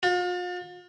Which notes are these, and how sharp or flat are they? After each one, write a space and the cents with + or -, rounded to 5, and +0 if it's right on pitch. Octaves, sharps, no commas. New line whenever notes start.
F4 +40